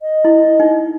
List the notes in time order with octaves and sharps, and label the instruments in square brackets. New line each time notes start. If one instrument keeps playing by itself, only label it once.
[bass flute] D#5
[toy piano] E4
D#4